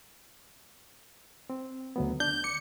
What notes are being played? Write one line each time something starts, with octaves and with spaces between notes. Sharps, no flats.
C4
D2 F#3 B3
D4 G6
D6 C#7